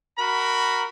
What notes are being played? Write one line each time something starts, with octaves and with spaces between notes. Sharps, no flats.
F#4 A#4 B5